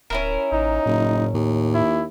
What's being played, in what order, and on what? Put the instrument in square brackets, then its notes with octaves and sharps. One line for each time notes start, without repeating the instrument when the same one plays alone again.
[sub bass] D1 [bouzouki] C#4 E4 A#4
[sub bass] A1 [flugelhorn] D#4
[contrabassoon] F#1 [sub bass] A2
[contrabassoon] D#2 [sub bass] A2
[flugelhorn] E4